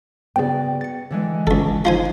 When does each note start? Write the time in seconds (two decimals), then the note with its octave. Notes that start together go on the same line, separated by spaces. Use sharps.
0.36 C#3 B3 F#4 D5 G5
0.81 A6 C#7
1.11 D3 E3 G#3
1.47 G1 C#2 A4
1.85 D3 F3 D#4 C5 G#5